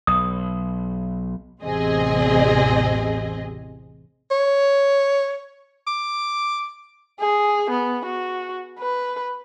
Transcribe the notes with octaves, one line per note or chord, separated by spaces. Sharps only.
B1 D#6
A1 E2 C3 C4 G#4 D#5
C#5
D6
G#4
B3
F#4
B4